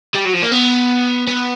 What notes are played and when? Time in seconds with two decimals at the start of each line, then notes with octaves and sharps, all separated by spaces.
0.14 G3
0.25 F#3
0.33 F3
0.42 A#3
0.52 B3
1.27 B3